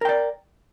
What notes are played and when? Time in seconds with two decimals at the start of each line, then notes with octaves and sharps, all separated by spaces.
0.01 A#4
0.05 G5
0.09 D5